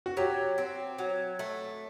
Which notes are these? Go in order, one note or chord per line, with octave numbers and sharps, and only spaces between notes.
F#4
F#3 G4
C4
F#3
A3